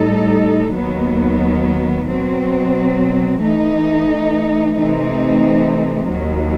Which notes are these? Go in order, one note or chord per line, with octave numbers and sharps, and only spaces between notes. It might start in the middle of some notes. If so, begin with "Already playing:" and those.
Already playing: A2 G3 D#4 A4
D#2 D#3 F#3 B3
B2 F#3 C4
E3 A3 D#4
C3 E3 A3 C4 D#4
D#2 D#3 F#3